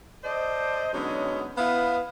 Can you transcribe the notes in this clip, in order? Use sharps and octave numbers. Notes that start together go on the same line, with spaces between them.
A4 C5 D5 D#5
D3 F#3 G#3 B3 C#4 D#4
B3 E4 F5